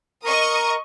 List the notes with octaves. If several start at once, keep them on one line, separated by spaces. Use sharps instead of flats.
A#4 D#5 A#5 C#6 D#6